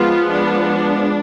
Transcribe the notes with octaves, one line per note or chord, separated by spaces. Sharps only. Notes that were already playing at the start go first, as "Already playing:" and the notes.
Already playing: F3 G#3 B3 F4
D4